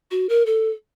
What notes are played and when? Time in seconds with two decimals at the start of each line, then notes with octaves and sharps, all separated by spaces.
0.11 F#4
0.29 A#4
0.46 A4